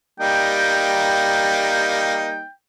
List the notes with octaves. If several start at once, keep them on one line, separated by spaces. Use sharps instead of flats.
G3 A#3 D#4 G5